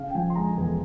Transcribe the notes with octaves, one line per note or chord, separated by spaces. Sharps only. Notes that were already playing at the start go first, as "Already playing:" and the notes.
Already playing: C#3 F5
G5
F3 G#5
C6
G#3 A#5
E2 G#5